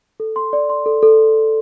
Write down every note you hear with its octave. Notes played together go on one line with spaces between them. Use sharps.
A4
C6
D5
C6
A4
A4